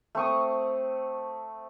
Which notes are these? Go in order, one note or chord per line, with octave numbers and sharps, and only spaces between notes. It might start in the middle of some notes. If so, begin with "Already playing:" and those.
A3 C4 C#6 D#6